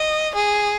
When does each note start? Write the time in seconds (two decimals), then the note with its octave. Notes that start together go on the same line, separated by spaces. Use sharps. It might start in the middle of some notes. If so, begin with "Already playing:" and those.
Already playing: D#5
0.35 G#4